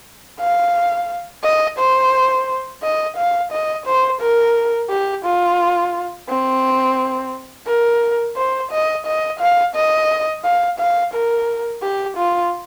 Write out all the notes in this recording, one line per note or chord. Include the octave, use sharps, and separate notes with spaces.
F5
D#5
C5
D#5
F5
D#5
C5
A#4
G4
F4
C4
A#4
C5
D#5
D#5
F5
D#5
F5
F5
A#4
G4
F4